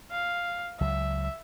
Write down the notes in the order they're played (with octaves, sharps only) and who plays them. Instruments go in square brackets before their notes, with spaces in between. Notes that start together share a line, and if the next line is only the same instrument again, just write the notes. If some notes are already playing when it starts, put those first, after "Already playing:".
[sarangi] F5
[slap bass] C#2 F#3 [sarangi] E5